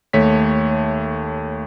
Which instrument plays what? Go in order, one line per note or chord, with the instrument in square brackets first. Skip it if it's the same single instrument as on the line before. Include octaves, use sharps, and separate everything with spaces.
[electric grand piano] D#2 A3 C#5 B6